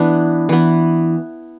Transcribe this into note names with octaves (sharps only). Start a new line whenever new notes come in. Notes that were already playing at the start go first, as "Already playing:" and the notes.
Already playing: E3 B3 D4
E3 B3